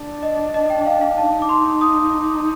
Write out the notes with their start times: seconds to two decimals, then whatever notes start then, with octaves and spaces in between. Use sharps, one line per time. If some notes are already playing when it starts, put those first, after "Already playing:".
Already playing: D4
0.23 D#5
0.54 D#5
0.70 G5
0.86 F5
1.01 F5
1.18 D#4 A5
1.42 D6
1.49 C6
1.81 D#6
2.12 D6